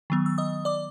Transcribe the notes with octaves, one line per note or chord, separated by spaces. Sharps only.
D#3 F#3 B3
E6
D#5 D#6
D5 D6